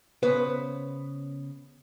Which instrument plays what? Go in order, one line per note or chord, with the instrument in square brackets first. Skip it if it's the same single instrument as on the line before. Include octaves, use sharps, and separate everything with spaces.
[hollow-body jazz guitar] C#3 B3 B4 C5